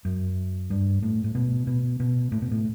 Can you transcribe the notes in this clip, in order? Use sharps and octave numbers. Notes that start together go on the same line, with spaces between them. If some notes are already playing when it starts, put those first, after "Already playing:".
F#2
G2
A2
A2
B2
B2
B2
A2
B2
A2